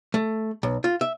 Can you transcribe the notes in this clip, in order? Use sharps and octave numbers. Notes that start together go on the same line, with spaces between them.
A3
B1
F4
E5